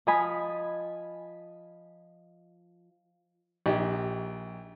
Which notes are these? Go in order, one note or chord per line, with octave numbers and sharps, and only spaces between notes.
F3 D#5 G#5 B5
A#1 D#4 G4